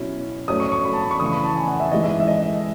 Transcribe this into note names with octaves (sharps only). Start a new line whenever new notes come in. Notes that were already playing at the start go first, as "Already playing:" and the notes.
Already playing: B2 F#3 C#4 E4
F#3 A3 C#4 D#6
C#6
C#6
B5
A5
B5
C#6
C#3 E3 A3 D#6
C#6
B5
A5
G#5
F#5
E5
E3 G#3 D#4 D#5
E5
E5
D#5